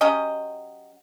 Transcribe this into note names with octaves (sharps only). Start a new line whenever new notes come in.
F#3 C#4 G4 D#5